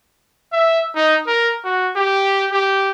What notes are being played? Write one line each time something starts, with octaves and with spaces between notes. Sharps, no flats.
E5
D#4
A#4
F#4
G4
G4